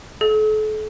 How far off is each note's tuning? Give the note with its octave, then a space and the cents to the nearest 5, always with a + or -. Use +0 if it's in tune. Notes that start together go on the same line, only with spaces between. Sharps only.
A4 -40